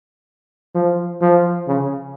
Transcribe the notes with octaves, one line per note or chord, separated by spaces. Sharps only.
F3
F3
C#3